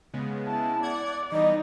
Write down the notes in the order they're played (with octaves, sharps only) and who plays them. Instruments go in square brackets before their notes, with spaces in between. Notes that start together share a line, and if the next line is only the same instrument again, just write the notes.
[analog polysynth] C#3 G#3 B3
[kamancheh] E4 A5
[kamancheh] D5 [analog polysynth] F#5 G#6
[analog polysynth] E3 G3 B3 [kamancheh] D#4 [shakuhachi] D#5